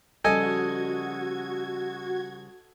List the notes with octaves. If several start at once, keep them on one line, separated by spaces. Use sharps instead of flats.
C#3 F3 G3 F#4 A4 D#5 G#5 G#6